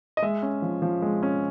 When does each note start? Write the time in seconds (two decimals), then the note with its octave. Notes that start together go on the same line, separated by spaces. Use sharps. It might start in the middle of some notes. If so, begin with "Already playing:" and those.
0.17 D#5
0.22 G#3 E5
0.43 C#4
0.62 F3
0.82 F3
1.02 G#3
1.23 C#4